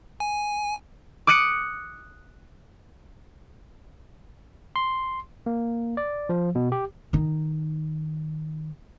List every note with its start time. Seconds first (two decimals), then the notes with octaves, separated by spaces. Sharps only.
0.20 G#5
1.27 D6 D#6 F#6 C#7 D#7
4.76 C6
5.46 A#3
5.97 D5
6.29 F3
6.55 B2
6.72 G4
7.13 D#3 D#4